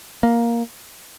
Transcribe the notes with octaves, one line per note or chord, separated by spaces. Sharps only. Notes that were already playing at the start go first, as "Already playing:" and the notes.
A#3